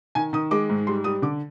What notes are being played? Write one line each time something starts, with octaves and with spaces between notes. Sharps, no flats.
D#3 G#5
D#3 D#6
G#3 D6
G#2
G3 C6
G3 D#6
D3 D6